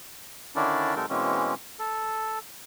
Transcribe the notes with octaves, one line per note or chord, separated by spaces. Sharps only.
D3 D#3 C#4 D4 E4 D5
C3 F#3 G#3 D#4 A4 A#4
B2 E3 G#3 A#3 C4 C#4
A4